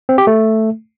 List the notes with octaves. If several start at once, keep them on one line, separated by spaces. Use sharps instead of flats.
C4
G4
A3